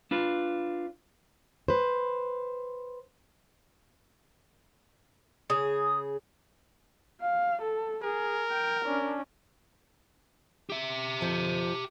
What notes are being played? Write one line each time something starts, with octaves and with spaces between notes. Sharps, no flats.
D4 F4 B4
B4 C5
C#3 G#4 D#6
F5
A4
G#4 A#4
G5
C#4 D4
G4 E5
F2 F3